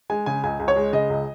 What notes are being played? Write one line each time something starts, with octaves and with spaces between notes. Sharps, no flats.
G#3 G#5
C#3 G#5
C#2 G#5
C#2
C#5
G#3
C#3 D#5
C#2